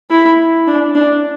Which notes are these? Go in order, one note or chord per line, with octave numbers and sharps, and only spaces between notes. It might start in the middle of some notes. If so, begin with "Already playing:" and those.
E4
D4
D4